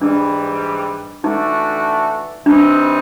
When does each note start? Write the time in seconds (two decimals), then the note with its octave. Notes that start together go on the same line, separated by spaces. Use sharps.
0.01 G#2 E3 G3 D4
1.24 E3 A3 D4 D#4 F#4 A4
2.46 C3 E3 G3 C4 D4 D#4